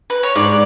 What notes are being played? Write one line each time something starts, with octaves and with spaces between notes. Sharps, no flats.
B4
C#5
G#2 D5